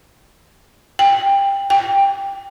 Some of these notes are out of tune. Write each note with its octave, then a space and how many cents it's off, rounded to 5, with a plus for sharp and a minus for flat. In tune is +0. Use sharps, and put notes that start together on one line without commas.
G5 +15
G5 +10